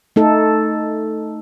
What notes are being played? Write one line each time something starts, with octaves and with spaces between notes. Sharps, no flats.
A3 D#4 A4